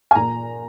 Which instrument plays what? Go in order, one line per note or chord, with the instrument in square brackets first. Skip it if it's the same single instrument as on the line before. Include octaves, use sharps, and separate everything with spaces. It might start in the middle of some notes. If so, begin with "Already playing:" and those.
[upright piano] G#5
A#2 A#5